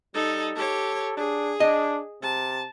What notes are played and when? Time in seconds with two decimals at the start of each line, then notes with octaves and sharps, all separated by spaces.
0.14 G3 D#4 A4
0.56 G4 A4 C#5
1.17 D4 G#4
1.60 D4 D#5
2.23 C3 A5